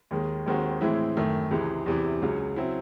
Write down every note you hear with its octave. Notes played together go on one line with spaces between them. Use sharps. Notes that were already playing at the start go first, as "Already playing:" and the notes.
D#2 D#3 G#3
D#2 D#3 G#3 C4 F#4
A2 E3 G#3 C4 E4
F#2 D#3 A3
C#2 C3 E3 G#3
E2 C3 E3
C#2 C#3 F#3
C#3 F#3 C4 E4